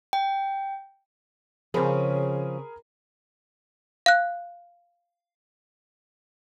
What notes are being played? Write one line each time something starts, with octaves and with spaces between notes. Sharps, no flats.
G5
C#3 F3 C4 C#4 G#4 A#4 B5
F5 F#6